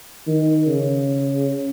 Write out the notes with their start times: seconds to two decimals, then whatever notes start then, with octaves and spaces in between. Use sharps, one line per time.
0.27 D#3
0.67 C#3